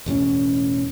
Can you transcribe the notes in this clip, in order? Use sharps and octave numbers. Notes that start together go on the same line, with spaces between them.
E1 E2 A2 C#4